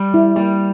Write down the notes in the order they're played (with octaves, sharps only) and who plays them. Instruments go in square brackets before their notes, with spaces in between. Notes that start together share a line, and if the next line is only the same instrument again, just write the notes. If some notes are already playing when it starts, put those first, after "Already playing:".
Already playing: [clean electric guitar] G3
[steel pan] E4
[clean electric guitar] G3 [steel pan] A#3